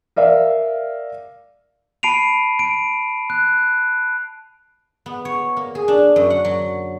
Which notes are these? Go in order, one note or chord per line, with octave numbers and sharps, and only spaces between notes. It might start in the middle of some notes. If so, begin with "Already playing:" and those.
A#4 D5 E5 F5
A5 B5 C7 D7 D#7 F7
D7
F#6
B3
C#5
A#3
G#4
D4
F#2
F#5
F#3